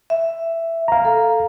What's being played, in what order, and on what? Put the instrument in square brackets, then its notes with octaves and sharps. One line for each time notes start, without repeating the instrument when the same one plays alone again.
[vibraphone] E5
[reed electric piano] F5 A#5
[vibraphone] A4